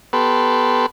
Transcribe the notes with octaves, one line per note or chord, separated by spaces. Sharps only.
B3 G4 A4 B4 C6